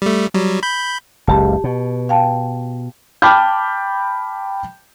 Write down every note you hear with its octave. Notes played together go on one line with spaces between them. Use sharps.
G3 A3
F#3 G3
B5 G6
F#1 C#2 G4 A5
B2
F5 G5 A5
G5 A5 B5 D6 F6 G6